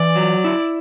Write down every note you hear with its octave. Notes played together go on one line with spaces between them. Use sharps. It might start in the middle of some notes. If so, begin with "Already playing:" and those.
Already playing: E3 D5
F#3
E4